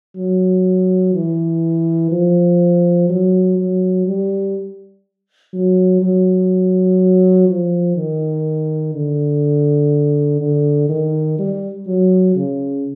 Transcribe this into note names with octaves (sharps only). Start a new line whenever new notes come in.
F#3
E3
F3
F#3
F#3
G3
F#3
F#3
F3
D#3
D3
D3
D#3
G3
F#3
C#3